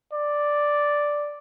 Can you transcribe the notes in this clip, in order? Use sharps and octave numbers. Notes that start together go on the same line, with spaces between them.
D5